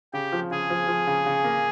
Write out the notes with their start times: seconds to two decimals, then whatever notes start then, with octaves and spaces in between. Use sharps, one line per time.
0.13 C#3 G4
0.32 F3
0.51 C#3 G#4
0.70 F3
0.88 F3
1.07 C#3
1.26 C#3
1.44 A#3